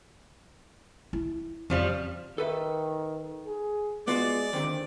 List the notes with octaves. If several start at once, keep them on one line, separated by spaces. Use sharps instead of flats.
E4
F2 C#3 F3 G3
D#3 A4 B4 E5
G#4
G#3 B3 F4 F#4 D5
D#2 D3 D#3 C4